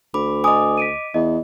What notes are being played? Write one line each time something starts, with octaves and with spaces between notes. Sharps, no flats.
D2 B5 D6
D#5 G#5 D6 D#6
B6 D7 D#7
E2 D#5